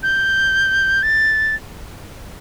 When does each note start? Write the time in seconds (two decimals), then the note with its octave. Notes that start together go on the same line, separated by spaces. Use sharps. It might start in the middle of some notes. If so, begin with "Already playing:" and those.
0.03 G6
1.03 A6